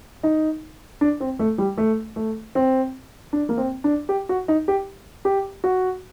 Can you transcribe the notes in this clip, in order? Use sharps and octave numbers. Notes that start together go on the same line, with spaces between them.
D#4
D4
C4
A3
G3
A3
A3
C4
D4
A#3
C4
D4
G4
F#4
D#4
G4
G4
F#4